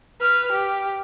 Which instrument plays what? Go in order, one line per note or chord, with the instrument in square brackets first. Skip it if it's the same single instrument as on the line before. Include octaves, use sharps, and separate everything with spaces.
[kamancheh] B4 F6
G4